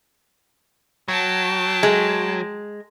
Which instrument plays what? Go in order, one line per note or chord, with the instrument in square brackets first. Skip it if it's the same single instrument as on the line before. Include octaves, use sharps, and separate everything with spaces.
[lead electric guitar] F#3 [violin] G5 A5
[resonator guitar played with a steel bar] G#3